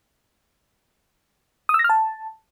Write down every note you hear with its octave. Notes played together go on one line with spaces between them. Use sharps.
D#6
E6
A#6
F6
A5